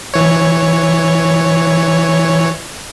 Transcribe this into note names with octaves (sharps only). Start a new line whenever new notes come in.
E3 C#5